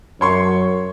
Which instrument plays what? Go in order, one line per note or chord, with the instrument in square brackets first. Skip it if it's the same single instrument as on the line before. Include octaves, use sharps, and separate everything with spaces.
[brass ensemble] F#2 [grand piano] C#5 C6 C#6